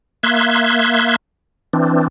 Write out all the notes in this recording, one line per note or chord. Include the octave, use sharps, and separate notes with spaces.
A#3 E5 C6 F#6 G#6
E3 C4 D4